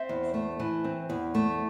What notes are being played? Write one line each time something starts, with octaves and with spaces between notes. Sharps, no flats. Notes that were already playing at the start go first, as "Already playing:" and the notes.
Already playing: C4 C5 E5
E2
A3
E3
C4
E2
A3